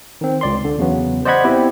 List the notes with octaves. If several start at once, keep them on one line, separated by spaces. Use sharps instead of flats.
D#3 C4
C#2 D5 C6
D3
E2 C#3 F#3 B3
C5 D5 D#5 F#5 B5 G#6
B3 C4 E4 G4